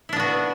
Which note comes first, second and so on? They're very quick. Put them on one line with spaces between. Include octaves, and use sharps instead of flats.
E4 D4 B3 F#4